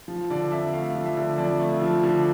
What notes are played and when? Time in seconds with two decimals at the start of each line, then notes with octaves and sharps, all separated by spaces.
0.08 F3
0.30 D3 D5
0.52 F2 E5
0.73 A3 F5
0.95 F3
1.06 E5
1.17 D3
1.38 F2 D5
1.59 A3
1.82 F3
2.03 D3